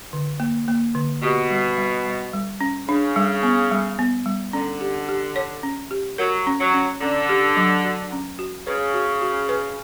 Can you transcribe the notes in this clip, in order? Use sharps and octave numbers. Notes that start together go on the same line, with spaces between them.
D3
A#3
A#3
D3
B2 G4
G3
G3
G3
G3
C#4
C#3 D4
G3
B3
G3
B3
G3
D3 C#4
G4
G4
C#5
C#4
G4
F#3 A#4
C#4
F#3
C#4
D3 C#4
G4
F#3
F#4
C#4
F#4
C#3 B4
F#4
F#4
B4